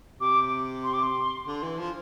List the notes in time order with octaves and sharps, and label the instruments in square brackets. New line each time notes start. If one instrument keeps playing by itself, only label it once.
[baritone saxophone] C3 [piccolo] D6
[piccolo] C6
D6
C6
[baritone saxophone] D3
E3
F3